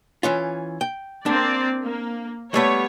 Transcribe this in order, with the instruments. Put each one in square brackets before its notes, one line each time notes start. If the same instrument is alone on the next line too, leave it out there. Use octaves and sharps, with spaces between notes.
[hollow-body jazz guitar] E3 C#4 F4
G5
[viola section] A#3 C4 D5 [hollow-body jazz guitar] D4
[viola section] A#3
[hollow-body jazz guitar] G3 A3 B3 [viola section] C#5